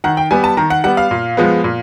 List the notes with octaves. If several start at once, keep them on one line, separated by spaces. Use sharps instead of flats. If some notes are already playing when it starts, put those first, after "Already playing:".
D#3 F#5
G5
G3 B3 G#5
A5
D#3 A#5
F#5
G3 B3 F#5
F5
A#2
F3 G#3 B3
A#2